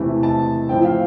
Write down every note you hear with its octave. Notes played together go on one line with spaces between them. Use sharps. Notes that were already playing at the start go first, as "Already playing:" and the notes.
Already playing: E2 C3 E3 A3
A5
A2 F3 C4 G5
F5